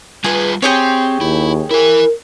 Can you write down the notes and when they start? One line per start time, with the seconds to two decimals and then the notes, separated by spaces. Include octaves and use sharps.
0.24 G3 F4 G#4 B4
0.62 C4 G4 G#4 C#5
1.21 D#2 E4
1.71 E4 A#4 G#5